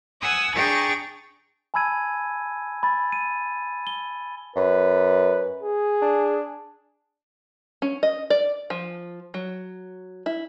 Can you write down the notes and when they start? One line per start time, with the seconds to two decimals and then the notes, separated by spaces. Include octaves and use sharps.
0.21 F#5 G#5 D#6 E6
0.54 D4 G#4 G5 A#5 C#6 A6
1.74 G#5 A5 B5 E6 G#6 D#7
2.83 B5 A6
3.12 D#7
3.87 G7
4.56 F#2 B4
5.63 G#4
6.02 D4
7.82 C#4
8.03 D#5
8.30 D5
8.70 F3
9.34 F#3
10.26 E4